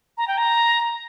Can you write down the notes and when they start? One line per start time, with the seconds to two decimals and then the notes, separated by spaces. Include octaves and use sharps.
0.18 A#5
0.28 G5
0.38 A#5